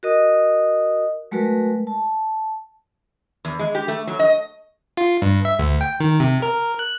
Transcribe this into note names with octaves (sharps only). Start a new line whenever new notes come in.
F#4 A#4 D#5 D#6
F#3 G#3 A3 F#4 A#4 B4
A5
E2
G#3
G4
A3
F#3
D#5
F4
G2
E5
D2
G5
D#3
C3
A#4
F#6